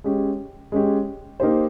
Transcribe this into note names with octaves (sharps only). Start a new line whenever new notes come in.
G#3 C#4 G4
G#3 C#4 G4
A#3 D#4 G4 C5